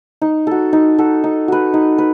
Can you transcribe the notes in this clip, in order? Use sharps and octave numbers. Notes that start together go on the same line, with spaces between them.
D#4
F#4 A4
D#4
F#4 A4
D#4
F#4 B4
D#4
B4